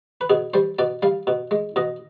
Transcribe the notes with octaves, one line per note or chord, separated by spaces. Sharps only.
B4
B2 G#4
G3 C5
B2 D5
G3 F5
B2
G#3
B2 D#5